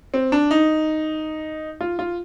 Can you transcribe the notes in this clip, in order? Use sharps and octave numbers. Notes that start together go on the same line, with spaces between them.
C4
D4
D#4
F4
F4